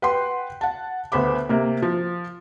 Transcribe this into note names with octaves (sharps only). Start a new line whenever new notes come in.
B4 F#5 G5 C6
F#5 A5
D2 B3 C5 B5 D6
C3 A#3
F3